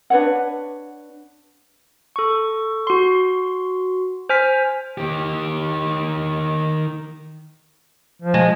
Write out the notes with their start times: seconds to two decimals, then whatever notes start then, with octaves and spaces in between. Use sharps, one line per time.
0.10 D4 B4 C#5 F#5
2.16 A4 C#6
2.87 F#4 C6
4.29 C5 G#5 F6 B6
4.98 D#3 G4
8.22 F3
8.34 G#3